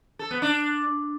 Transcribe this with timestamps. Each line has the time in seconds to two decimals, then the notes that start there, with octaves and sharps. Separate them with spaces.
0.19 A4
0.31 B3
0.42 D4